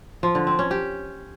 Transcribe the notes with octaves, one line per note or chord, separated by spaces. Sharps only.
F3
D3
C4
C#4
G4